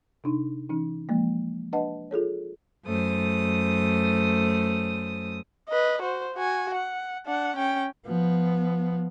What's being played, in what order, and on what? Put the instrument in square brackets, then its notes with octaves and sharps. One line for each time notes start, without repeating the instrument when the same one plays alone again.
[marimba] C3 D4 D#4
E3 C#4 D#4
F3 G#3 A#3
D4 B4 D#5 F#5 A5
F4 G#4 A4 C#5
[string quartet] F#2 A3 C5 D#6
[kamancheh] B4 D#5
F#4 C5
F#4 G#5
F#5
D4 F#5
C#4 G5
[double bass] F3 B3